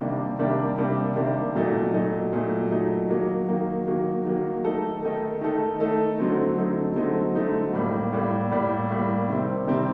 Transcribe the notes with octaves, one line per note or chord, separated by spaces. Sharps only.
C3 D#3 G3 A#3 D4
C3 D#3 G3 A#3 D4
C3 D#3 G3 A#3 D4
C3 D#3 G3 A#3 D4
A#2 F#3 A3 D#4
A#2 F#3 A3 D#4
A#2 F#3 A3 D#4
A#2 F#3 A3 D#4
D#3 F#3 A#3
D#3 F#3 A#3
D#3 F#3 A#3
D#3 F#3 A#3
D#3 A3 D#4 A4
D#3 A3 D#4 A4
D#3 A3 D#4 A4
D#3 A3 D#4 A4
D3 F#3 A3 C4 D#4
D3 F#3 A3 C4 D#4
D3 F#3 A3 C4 D#4
D3 F#3 A3 C4 D#4
A2 G3 A#3
A2 G3 A#3
A2 G3 A#3
A2 G3 A#3
C3 D#3 G3 C4
C3 D#3 G3 C4